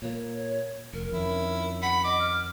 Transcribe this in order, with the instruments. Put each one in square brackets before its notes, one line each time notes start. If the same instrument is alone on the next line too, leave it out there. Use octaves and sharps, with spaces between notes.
[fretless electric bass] A#2 A#3 [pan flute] C#5
[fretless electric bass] F1 [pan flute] A#4
[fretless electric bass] F2 D#3 C#4 [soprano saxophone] E4
[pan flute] F#5 [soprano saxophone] B5
[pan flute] D#5 [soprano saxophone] D6
[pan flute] F6